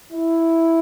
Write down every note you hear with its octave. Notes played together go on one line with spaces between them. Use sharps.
E4